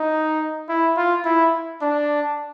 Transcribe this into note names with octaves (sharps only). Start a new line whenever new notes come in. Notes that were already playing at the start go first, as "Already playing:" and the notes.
Already playing: D#4
E4
F4
E4
D4